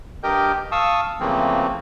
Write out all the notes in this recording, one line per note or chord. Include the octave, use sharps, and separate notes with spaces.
G2 G4 A#4 D#5 G5 G6
F5 A5 C#6 D#6 E6
C#3 E3 F3 A3 A#3 C4